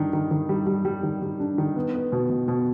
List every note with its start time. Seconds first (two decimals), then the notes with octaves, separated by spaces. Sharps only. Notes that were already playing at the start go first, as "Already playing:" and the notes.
Already playing: G2 D#3 D4
0.13 D#3
0.31 D#3
0.49 G3
0.67 G3
0.85 G3
1.03 D#3
1.22 G3
1.40 D4
1.58 D#3
1.76 B3
1.94 B3
2.12 B2
2.30 B2
2.48 B2